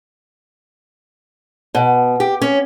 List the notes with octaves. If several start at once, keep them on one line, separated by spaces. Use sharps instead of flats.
B2
G4
C#4